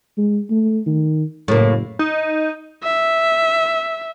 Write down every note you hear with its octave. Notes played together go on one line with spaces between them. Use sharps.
G#3
A3
D#3
F#1 A2 A#3
D#4
E5